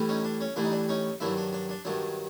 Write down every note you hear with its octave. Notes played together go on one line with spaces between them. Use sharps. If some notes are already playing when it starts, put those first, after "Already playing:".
Already playing: A2 E3 G3
C#4 D#4
D4
C#4
A2 E3 G3 D4
D#4
D4
C#4 D#4
G2 D#3 F#3 D4 E4
D4
D4
D4
G2 D#3 F#3 D4